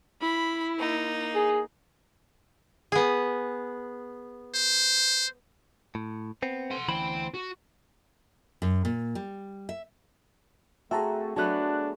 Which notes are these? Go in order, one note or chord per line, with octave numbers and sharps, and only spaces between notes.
E4 B5
A#3 D#4
G#4
B3 G#4
C5
A2
B3 C4
F#5 C6
D2 E3 C5 G5 B5
F#4
F#2
A#2
G3
E5
A3 C4 F#4 G#4 E5 A5 A#5
F#3 A3 B3 D4 A5 F#6